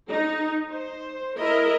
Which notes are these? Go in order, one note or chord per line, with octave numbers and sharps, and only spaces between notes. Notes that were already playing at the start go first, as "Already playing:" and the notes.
D#4
C5
E4 A#4 D#5 E5